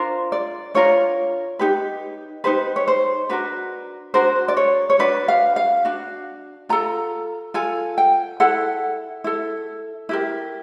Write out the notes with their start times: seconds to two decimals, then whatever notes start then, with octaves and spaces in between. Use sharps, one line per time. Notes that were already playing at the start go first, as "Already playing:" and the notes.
Already playing: D4 F4 A#4 C5
0.32 D5
0.74 D4 F4 A#4 C#5
1.59 D#4 G4 B4
2.44 D#4 G4 B4 C5
2.76 C#5
2.88 C5
3.29 D4 F#4 A#4 B4
4.14 D4 F#4 A#4 C5
4.48 D5
4.57 C#5
4.90 C#5
4.99 D4 F#4 B4 D5
5.28 F5
5.56 F5
5.85 D4 F#4
6.69 F4 A4 A#5
7.54 F4 A4 G#5
7.98 G5
8.40 E4 A4 F#5
9.24 E4 A4
10.09 E4 G4 A#4